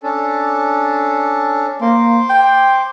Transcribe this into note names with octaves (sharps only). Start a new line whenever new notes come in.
C#4 D4 A4
A#3 C5 C6 D6
G5